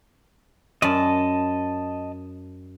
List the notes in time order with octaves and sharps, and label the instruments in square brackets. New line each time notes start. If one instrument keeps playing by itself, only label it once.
[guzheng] F#2 D5 [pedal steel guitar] D#5 A5